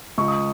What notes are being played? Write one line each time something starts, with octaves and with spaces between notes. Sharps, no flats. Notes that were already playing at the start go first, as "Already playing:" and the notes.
C#2 C#6
D#6